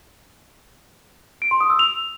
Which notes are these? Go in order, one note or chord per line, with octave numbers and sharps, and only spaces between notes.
D7
C6
D#6
E6
F7